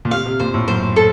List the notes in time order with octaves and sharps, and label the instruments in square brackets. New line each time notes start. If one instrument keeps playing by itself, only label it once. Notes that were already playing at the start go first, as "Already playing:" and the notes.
[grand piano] A#2
[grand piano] C3 [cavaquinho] F5
[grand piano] C3
[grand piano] A#2 [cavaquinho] C5
[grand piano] A2
[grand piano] F#2 [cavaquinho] C5
[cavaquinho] A4